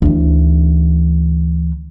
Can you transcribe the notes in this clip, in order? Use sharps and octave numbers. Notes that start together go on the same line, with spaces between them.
D2 E3